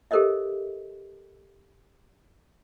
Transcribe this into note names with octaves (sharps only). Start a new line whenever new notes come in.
G4 A4 A#4 C5 D#5 E5